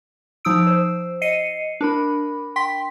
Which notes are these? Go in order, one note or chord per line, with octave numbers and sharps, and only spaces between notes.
F3 D#4 D#6 E6 D7
C5
D#5 C7 C#7 D#7
D4 A#4 B5
G5 C6 B6